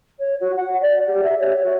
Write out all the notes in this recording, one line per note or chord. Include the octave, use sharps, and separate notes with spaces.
C#5
F#4
F#5
D5
G4
E5
C#5
F#4